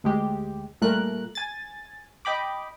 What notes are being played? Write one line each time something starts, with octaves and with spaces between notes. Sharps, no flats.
D2 G#3 G4
A#2 G3 A3 A#4 F#6
G#5 A6
D#5 G5 B5 D6